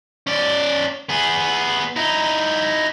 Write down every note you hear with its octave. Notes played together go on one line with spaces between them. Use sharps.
C#4 D5
B3 G#4
D#4 E4